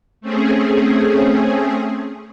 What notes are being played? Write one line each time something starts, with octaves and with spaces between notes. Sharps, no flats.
A3 C4 C#4 G#4